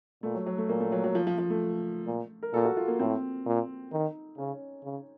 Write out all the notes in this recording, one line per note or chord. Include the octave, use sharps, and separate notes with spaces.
A#2 A3
F#3
F#3
A3
A#2 A#3
A3
F#3
F#3
F3
F3
F3
A3
A#2
A#4
A#2 A4
F#4
F4
A#3
A2 C4
A#2
D#3 D#4
C#3 C#4
C#3